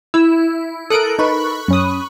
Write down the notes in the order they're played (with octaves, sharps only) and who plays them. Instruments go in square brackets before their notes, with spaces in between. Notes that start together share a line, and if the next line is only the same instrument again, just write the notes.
[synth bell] E4 [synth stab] E6
[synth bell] A4 A#4 [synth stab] D#6 F#6 D7
[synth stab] D#4 B4 [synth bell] B5 C#6 F#6
[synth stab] F#2 C#4 D#6